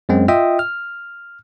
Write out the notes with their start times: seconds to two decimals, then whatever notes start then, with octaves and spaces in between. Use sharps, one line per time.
0.09 F#2 G#3 C4
0.28 F4 D#5 E5 G5 D#6
0.59 F6